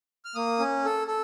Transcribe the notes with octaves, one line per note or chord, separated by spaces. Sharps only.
F6
A#3 D#6
C#4
A4
A4